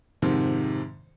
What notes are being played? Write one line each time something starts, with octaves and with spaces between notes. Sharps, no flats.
F2 G#2 C3 D#3